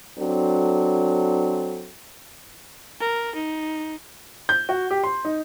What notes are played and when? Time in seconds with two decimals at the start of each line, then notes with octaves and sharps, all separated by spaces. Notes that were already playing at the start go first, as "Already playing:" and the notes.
0.18 F#3 C4 D4 A4
3.01 A#4
3.35 D#4
4.49 G6
4.69 F#4
4.91 G4
5.04 C6
5.25 D#4